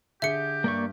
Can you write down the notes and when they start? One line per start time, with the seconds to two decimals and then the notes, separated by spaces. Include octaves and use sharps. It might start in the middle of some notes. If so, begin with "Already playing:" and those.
0.22 D3 G4 G#4 E5 G6 C#7
0.64 G2 A#3 D5 C#6